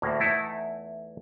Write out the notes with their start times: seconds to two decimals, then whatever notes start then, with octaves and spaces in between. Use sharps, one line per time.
0.02 D2 A2 A#3
0.20 E2 A3 D#4 E4